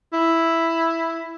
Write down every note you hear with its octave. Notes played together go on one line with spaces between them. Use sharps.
E4